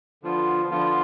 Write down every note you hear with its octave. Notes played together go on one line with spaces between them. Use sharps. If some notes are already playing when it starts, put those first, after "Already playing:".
D3 F3 B3 F4
D3 F3 B3 F4